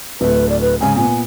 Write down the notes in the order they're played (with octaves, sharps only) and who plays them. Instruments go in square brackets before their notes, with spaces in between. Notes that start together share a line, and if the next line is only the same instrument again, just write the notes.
[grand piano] D1 A3 [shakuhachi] B4
[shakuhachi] D5
B4
[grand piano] G#2 C#3 [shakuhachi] G#5
[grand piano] A#2 B3 [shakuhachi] G#5